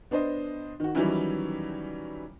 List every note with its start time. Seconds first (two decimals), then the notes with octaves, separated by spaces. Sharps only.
0.11 B3 D4 C5 D#5
0.80 D#3 F#4
0.95 D#3 E3 F#3 G3 C#4 E4